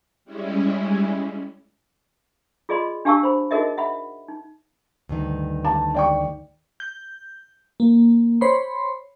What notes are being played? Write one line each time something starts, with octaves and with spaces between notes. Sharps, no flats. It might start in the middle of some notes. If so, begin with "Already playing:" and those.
G3 G#3 C#4 E4
F4 G#4 D5 D#5 B5 C6
D4 G4 F5 A5 C#6 E6
C5 B5
D#4 F#4 G#4 A#4 D#5 E5
E5 F#5 B5
D#4
D2 G2 D#3
A5
D5 G5 C#6
G6
A#3
C5 C#5 B5 C6